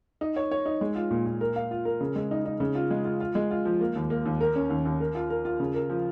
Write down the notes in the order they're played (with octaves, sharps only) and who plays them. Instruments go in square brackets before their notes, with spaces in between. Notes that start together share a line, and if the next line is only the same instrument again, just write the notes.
[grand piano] D#4
C#5
C#5
D#4
G#3
F4
A#2
A#2
A#4
F5
F4
A#4
C#3
G#3
D#4
D#4
C#3
F4
G#3
F4
F4
G#3
F4
F3
A#3
D#2
A#3
D#2
A#4
C#4
D#2
D#2
A#4
F4
A#4
F4
C#3
A#4
F3